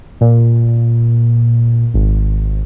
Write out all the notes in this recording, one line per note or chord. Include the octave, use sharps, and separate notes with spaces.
A#2
G#1